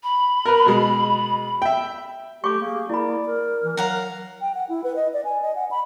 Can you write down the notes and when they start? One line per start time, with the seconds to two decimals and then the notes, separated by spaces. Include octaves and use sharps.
0.03 B5
0.45 A#4 B4
0.66 B2 G#3
1.62 E5 G5
2.44 A3 G4 C#6 D6
2.61 A#3 G#4
2.90 A#3 E4 D5 B5
3.26 A#4
3.63 E3
3.77 F#3 F5 F#5 A#5
4.41 G5
4.55 F#5
4.69 E4
4.84 B4
4.96 D#5
5.13 D5
5.25 G#5
5.42 D#5
5.56 F#5
5.71 B5